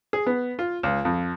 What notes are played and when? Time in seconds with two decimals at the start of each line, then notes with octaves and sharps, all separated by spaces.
0.13 G#4
0.27 B3
0.59 F4
0.83 C#2
1.05 F2